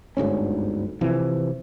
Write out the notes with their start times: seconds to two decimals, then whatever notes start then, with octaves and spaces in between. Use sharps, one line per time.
0.17 G1 D2 G#2 C#4
1.01 C3 E3 F3